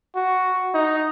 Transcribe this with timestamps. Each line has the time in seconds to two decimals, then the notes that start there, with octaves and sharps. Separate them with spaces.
0.16 F#4
0.75 D#4